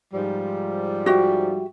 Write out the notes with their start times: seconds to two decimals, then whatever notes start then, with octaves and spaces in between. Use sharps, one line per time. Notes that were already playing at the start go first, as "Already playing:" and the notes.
0.14 G#2 F3 G3
1.06 F#4 G4 E5